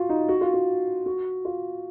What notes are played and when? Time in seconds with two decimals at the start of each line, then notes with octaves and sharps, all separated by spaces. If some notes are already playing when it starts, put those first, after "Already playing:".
Already playing: F4 F#4
0.09 D#4
0.29 F#4
0.41 F4
0.54 F#4
1.06 F#4
1.45 F4